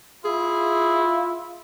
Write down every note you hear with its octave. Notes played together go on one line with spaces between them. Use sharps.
E4 F4 G#4